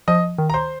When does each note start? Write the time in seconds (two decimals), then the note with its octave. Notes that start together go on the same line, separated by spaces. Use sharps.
0.08 F3 D#5 D#6
0.38 D#3
0.50 A#5
0.54 C5 C6